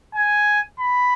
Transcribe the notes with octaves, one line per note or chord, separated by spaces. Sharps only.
G#5
B5